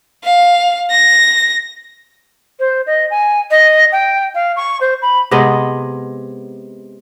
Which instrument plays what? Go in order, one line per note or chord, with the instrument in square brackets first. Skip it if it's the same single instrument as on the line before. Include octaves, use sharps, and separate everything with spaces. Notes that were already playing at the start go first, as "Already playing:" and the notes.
[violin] F5
A#6
[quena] C5
D#5
G#5
D#5
G5
F5
C#6
C5
B5
[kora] C3 G#3 B3 D#5